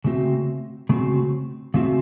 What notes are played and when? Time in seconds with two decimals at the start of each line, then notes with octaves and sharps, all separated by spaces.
0.04 C#3 A3 C4 F#4
0.89 C#3 A3 C4 F#4
1.74 C#3 A3 C4 F#4